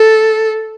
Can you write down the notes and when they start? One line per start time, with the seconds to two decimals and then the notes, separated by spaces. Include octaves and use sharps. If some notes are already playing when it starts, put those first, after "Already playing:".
Already playing: A4